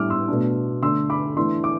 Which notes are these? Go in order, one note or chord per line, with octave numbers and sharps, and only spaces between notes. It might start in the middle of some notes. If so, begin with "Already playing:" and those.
Already playing: A2 G3 D4 D6 F6
C6 E6
B2 A3 D4
D3 A3 D4 C6 E6
B5 D6
E3 A3 D4 C6 E6
D6